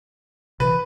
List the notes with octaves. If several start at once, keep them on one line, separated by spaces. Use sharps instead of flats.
C3 D#3 E3 B4